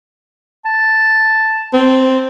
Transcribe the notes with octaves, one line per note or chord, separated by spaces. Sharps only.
A5
C4